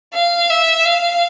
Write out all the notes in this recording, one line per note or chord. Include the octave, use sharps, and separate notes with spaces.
F5
E5
F5